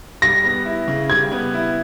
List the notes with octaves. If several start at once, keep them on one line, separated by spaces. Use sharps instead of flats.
G3 A#6
B3
E4
C#3
G3 G#6
B3
E4